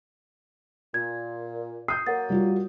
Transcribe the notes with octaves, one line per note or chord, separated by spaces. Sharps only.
A#2 G#6
D#6 G6 C7
F#3 A#3 A#4 F#5 A6
G3 F4 F#4